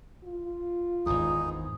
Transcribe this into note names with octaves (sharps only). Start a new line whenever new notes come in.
F4
G#1 E2 D#4 G#4